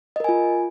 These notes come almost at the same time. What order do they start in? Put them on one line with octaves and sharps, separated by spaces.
D#5 A#4 G#5 F4